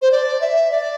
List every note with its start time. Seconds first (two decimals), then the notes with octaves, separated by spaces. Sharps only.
0.02 C5
0.12 D5
0.41 E5
0.71 D5